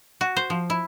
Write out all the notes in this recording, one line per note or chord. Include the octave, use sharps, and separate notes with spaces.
F#4
C5
F3
E4